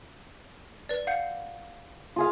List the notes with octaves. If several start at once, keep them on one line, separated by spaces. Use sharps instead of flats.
B4 D5
F5 F#5 G6
F4 G#4 F5